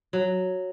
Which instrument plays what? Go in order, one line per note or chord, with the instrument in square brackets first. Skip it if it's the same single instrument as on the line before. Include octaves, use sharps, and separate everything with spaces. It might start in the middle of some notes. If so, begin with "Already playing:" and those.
[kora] F#3